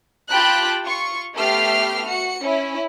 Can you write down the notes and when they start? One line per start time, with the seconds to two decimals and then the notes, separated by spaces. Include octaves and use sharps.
0.28 F4 G4 G5 A5 B5 F#6
0.85 F4 C#6
1.35 A3 B3 G4 E5 F6 C7
2.05 F#4 C#7
2.41 C#4 E4